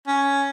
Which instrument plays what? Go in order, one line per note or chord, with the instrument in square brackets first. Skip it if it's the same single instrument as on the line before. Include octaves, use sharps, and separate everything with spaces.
[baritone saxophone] C#4